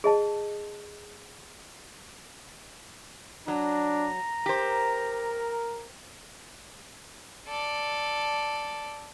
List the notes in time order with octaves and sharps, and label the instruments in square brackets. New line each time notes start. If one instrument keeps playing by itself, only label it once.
[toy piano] G#4 D#5 A5
[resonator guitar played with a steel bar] F#3 [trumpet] D4 [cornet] A#5
[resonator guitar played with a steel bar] G4 C5 [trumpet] A#4
[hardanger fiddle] A4 D5